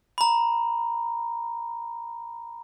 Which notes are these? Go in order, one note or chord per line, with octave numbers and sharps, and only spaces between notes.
A#5 B5